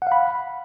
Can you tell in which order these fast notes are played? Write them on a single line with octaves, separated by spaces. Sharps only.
F#5 F5 B5